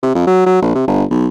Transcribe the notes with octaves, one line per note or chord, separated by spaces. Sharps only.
C3
F2
F#3
F#3
A#1
C3
G1
B1